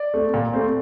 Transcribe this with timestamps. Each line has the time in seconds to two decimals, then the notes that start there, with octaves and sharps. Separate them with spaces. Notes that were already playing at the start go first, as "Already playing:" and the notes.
Already playing: D5
0.14 A3 C4
0.34 A#2
0.53 A3 C4